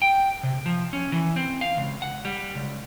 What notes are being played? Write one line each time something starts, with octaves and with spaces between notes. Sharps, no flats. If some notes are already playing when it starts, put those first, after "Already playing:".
G5
C3
F3
C#4
E3
C4
F5
C#2
F#5
G3
C#2